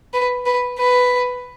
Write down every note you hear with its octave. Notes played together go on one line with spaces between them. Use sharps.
B4
B4
B4